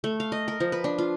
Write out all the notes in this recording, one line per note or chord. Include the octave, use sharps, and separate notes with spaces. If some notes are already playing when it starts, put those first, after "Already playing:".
A3
F5
D#5
A#4
F3
B4
D4
F4